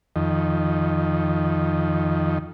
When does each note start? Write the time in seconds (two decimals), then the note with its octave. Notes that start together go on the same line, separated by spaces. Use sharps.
0.16 F2 D#3